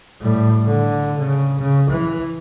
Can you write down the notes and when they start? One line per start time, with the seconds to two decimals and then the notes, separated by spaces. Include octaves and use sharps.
0.21 A2 G3
0.66 D3
1.18 C#3
1.60 C#3
1.90 E3